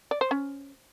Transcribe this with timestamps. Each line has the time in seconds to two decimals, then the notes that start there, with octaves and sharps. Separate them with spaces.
0.11 D5
0.21 C5
0.31 C#4